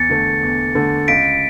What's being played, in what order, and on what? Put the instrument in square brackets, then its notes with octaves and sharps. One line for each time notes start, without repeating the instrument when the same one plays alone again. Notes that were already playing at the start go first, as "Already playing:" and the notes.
Already playing: [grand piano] E2 [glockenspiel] A6 C#7
[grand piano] D3 A3
E2
D3 A3
[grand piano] C#2 [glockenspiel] B6 D7